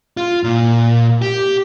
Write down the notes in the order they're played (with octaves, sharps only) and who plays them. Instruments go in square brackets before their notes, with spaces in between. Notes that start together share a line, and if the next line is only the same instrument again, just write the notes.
[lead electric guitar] F4
A#2
G4